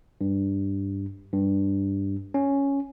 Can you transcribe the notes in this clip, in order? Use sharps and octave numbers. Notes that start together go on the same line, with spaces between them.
G2
G2
C#4